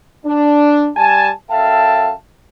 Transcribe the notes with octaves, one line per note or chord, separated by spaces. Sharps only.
D4
G3 G#5 A5
F#2 A4 E5 F5 G5 A5